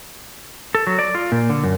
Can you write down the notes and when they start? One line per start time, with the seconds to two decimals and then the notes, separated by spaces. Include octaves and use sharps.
0.75 A4
0.87 F#3
0.99 D5
1.15 F4
1.32 A#2
1.50 D3
1.63 F#2